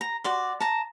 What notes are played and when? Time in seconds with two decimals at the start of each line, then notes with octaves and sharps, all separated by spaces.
0.01 A#5
0.24 F#4 D5 C6
0.60 A5 A#5